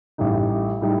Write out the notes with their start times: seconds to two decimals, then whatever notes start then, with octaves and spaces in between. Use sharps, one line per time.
0.18 A1 A2 G3 D#4
0.81 A2 G3 D#4